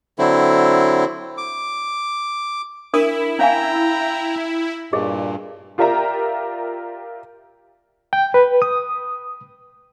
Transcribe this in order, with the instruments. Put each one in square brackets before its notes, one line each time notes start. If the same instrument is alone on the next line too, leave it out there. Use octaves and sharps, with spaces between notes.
[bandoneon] D3 F#3 C4 E4
D6
[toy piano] D4 A#4 D#6 [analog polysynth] E4
[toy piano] C#4 F5 G#5 [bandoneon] G5 A#5
[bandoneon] G2 A#2 [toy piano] G4 G#4 D#5
[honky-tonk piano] F4 G4 A#4 D5 E5 A#5
[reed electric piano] G5
B4
D#6